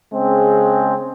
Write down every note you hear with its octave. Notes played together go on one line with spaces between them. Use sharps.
C#3 G#3 C4